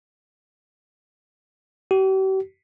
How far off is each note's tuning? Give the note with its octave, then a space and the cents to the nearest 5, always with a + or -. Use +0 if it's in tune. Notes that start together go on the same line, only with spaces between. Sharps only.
G4 -45